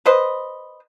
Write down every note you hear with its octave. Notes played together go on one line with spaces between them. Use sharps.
B4 C5 D#5